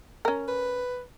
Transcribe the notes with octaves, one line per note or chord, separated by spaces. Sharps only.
C#4 A#4
B4